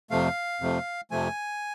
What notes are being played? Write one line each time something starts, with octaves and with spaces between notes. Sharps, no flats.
F2 C3 F3 A3 F5
F2 C3 F3 A3
F2 C3 F3 A3 G#5